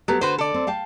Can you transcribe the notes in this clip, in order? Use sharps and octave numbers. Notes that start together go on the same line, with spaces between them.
F#3 B3 G4 A4
D3 F#4 B4 C5
A4 D5
C4
F5 G5 A5